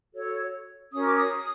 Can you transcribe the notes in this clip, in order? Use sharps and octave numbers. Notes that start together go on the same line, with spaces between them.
F#4 A4 C#5
C#4 F#4 A#4 D#6
D6
D#6